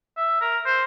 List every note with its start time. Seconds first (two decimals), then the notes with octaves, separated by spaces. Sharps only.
0.17 E5
0.41 A#4
0.66 C5